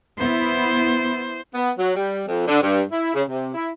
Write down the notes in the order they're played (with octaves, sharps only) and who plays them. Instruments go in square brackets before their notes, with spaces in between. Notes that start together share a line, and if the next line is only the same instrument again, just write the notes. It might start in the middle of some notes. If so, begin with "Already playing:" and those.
[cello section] B3 E4 [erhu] C5
[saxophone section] B3
F#3
G3
F2
D3
G2
E4
C#3
C3
E4